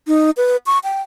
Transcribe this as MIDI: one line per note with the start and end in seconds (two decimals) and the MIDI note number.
0.08 0.30 63
0.37 0.57 71
0.66 0.79 85
0.84 1.02 79